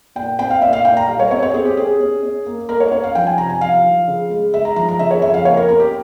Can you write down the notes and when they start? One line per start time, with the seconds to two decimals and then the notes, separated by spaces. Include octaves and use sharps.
0.16 A#2 G5
0.39 C4 G5
0.50 F5
0.62 A#2 E5
0.73 F5
0.85 A#2 G5
0.97 A#5
1.08 G3 F5
1.20 C#5
1.31 C4 C#5
1.43 C#5
1.54 C4 G#4
1.65 G4
1.77 C#4 G#4
2.00 C#4
2.23 C#4
2.46 A#3
2.69 A#3 A#4
2.80 C#5
2.92 C#4 C#5
3.04 F5
3.15 F3 G5
3.27 G#5
3.38 C3 A#5
3.50 G#5
3.61 F3 F5
3.84 F3
4.08 C#3
4.30 G#3
4.53 G#3 E5
4.65 A#5
4.76 F3 A#5
4.88 A#5
4.99 C#3 E5
5.11 C#5
5.22 F2 E5
5.34 F5
5.45 A#3 C#5
5.57 A#4
5.69 C#4 A#4
5.80 G4